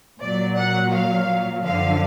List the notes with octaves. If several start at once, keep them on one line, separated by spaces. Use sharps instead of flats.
A#2 F#3 D5
F#5
F5
F#2 D3 F3 F5